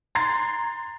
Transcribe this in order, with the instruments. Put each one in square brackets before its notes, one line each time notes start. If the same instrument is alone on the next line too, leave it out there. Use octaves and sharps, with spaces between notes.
[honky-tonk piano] A#5 C6 G#6 A6 C7